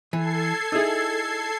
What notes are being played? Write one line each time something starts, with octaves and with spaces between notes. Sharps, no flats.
E3 A4 G#6 C7
D#4 E4 G#4